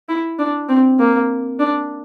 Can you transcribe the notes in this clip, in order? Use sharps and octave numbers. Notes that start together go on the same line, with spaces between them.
E4
D4
C4
A#3
D4